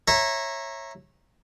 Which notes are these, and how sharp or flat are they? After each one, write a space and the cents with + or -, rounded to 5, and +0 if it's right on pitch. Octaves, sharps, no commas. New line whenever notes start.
C#5 -20 E5 +0 A#5 +0